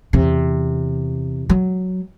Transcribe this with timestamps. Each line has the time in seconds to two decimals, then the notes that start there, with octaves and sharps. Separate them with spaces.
0.13 E2 C3
1.49 F#3